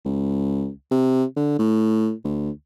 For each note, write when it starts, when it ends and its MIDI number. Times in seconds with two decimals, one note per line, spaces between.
0.05 0.69 37
0.91 1.24 48
1.36 1.56 50
1.59 2.12 45
2.24 2.50 38